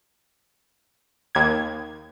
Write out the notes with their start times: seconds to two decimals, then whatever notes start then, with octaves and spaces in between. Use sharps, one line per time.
1.35 D#2 G#6